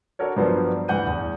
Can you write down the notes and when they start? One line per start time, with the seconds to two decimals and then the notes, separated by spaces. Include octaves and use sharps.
0.19 D4 F#4 A4 A#4 C#5
0.36 G2 F3 F#3 B3 D4 C5
0.88 D2 G2 E3 F#5 G6 D#7
1.07 E2